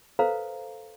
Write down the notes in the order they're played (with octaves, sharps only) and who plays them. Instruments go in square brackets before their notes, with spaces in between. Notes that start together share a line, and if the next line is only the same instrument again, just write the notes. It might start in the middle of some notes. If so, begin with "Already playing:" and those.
[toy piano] A4 B4 C5 F5 A#5